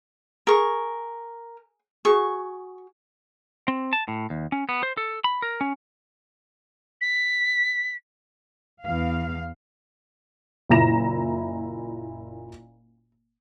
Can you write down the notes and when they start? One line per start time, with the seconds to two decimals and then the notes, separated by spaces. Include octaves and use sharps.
0.47 G#4 A#4 C#6
2.05 F#4 G#4 C#6
3.68 C4
3.93 A5
4.08 A2
4.30 D#2
4.52 C#4
4.69 B3
4.83 C5
4.97 A4
5.24 B5
5.42 A#4
5.61 C#4
7.01 B6
8.83 E2 F5
10.69 F#1 A#2 E4 A#5 A#6 E7